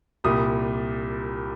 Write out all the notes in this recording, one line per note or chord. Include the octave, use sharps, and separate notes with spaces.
C2 A#2 G3 D#6